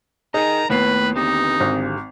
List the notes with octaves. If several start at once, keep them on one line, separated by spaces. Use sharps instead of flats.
D#4 G#4 A#4 D#5 A#5
D#2 A3 B3 E4 B4 C7
D3 C4 D#4 G4
G#1